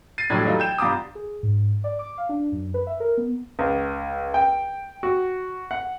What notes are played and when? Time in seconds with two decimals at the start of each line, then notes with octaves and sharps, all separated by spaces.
0.18 A6 C7 D#7
0.30 F2 A2 F#3 D4 G4 G#6
0.44 E3 F#3 G3 A3 D#4 F4
0.59 G5 G6 E7
0.78 G2 F4 A#5 D6 D#6
1.15 G#4
1.43 G#2
1.84 D5
1.99 D6
2.18 F5
2.29 D4
2.52 F#2
2.74 B4
2.87 E5
3.00 A#4
3.17 B3
3.59 C#2
4.34 G5
5.03 F#4
5.71 F#5